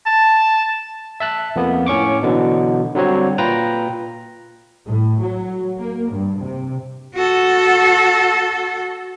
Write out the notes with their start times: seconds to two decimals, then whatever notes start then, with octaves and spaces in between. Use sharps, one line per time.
0.06 A5
1.20 E5 A5 F#6
1.56 F2 A#3 B3
1.86 A2 C#4 C#6 D6
2.23 B2 D3 E3 F#3
2.95 D3 F#3 G3 C4 C#5
3.38 A#2 F4 B4 G5 A#5 A#6
4.86 A2
5.20 F#3
5.77 A#3
6.10 G2
6.40 C3
7.15 F#4 A4